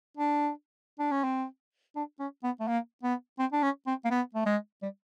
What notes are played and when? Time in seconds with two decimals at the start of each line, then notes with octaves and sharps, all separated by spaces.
0.17 D4
0.99 D4
1.11 C#4
1.24 C4
1.96 D4
2.20 C#4
2.43 B3
2.60 A3
2.68 A#3
3.03 B3
3.39 C4
3.52 D4
3.62 C#4
3.87 C4
4.05 A#3
4.11 B3
4.35 A3
4.46 G#3
4.82 G3